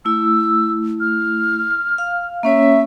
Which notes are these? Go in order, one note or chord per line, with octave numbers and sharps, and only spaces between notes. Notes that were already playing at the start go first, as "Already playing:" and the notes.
A3 E4 E6
F6
F5
A#3 C#4 C#5 E5